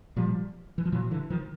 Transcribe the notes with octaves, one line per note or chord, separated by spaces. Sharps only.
A#2 F3 G3
E3
F3
A#2 E3 F#3
D3 E3
D#3 F3